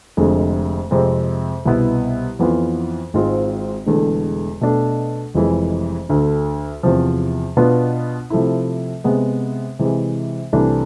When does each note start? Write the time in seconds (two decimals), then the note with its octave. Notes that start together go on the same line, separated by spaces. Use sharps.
0.17 F1 F2 D3 G#3
0.91 F2 C3 G#3 C4
1.65 C2 B2 B3 E4
2.39 F2 E3 B3 F4
3.14 G#1 G#2 G#3 C4 F4
3.87 E1 E2 D3 A3
4.61 B2 A3 D4
5.34 F1 F2 E3 G#3
6.09 D2 D3 A3
6.83 E2 C3 F3
7.57 B2 B3 D4 F4 B4
8.30 C3 F3 A3 E4
9.04 C3 G#3 B3
9.79 C3 E3 G#3
10.52 C2 C3 E3 A3 D4